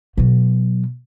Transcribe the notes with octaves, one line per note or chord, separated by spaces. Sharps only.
B2 F#3